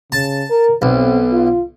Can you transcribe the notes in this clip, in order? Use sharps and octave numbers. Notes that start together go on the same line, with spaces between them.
C#3 A5
A#4
B1 C4
F4